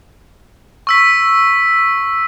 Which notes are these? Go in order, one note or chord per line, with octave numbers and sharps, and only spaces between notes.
C#6 E6 B6